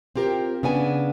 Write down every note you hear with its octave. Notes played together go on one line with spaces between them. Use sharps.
C4 F4 G4 A#4
C#3 B3 D4 G#5